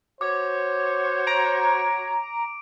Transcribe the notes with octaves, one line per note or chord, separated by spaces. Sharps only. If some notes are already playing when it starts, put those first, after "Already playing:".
F#4 C5 C#5 D6
A#5 D7